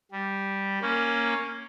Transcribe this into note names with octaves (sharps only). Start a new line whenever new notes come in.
G3
A#3 C#4